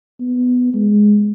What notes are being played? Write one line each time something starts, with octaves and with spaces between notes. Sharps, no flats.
B3
G#3